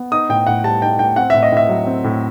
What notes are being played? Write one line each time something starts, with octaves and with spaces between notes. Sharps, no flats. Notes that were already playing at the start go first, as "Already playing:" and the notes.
Already playing: B3
D#4 D#6
A2 G5
A2 F#5
G3 A5
D#4 G5
A2 G5
C4 F#5
A2 E5
D#5
A2 E5
F#3
C4
A2